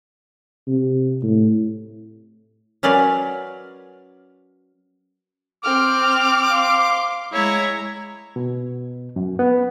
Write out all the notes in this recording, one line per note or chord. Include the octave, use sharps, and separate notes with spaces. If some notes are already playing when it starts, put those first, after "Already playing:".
C3
A2
F#3 C#4 A#4 B4 D5 F5
C4 D6 F6
F5 C6
G#3 E4 C#5 A#5
B2
F#2
B3